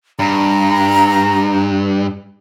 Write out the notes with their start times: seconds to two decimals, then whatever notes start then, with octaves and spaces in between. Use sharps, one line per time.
0.19 G2 A#5